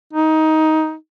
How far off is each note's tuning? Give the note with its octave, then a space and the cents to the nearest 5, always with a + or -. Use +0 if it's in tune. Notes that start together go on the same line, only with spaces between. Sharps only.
D#4 +15